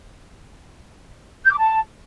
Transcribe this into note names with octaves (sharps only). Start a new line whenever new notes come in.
G6
D6
A5